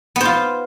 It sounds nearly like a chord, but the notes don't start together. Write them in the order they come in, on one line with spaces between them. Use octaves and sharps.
B3 C5 F4